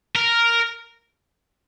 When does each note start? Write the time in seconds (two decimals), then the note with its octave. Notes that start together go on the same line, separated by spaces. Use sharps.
0.15 A#4